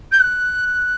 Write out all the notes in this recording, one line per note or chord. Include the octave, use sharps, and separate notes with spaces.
G6
F#6